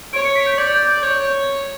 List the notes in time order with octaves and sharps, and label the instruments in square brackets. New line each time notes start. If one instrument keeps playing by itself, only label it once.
[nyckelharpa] C#5 [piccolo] D7
[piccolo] C#7
B6
G6
[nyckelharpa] D5 [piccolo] G6
[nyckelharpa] C#5